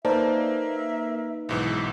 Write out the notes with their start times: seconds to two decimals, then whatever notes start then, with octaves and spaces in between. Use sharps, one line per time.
0.05 A#3 D#4 B4 C5 D5 E5 A5
1.49 B1 G#2 E3